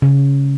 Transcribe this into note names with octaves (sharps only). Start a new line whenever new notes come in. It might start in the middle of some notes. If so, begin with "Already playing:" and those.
C#3